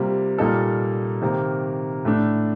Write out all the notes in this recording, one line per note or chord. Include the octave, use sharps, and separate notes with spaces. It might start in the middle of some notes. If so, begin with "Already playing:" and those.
Already playing: C3 G3 A#3 F4
A#2 G3 A#3 D#4 A4
C3 D#3 A#3
A2 A3 D4